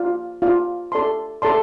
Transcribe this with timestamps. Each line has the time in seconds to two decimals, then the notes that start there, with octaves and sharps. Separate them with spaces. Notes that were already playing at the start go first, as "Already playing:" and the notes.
Already playing: F4 D5 F5
0.42 F4 D5 F5
0.92 A4 D5 A5 C6
1.42 A4 D5 A5 C6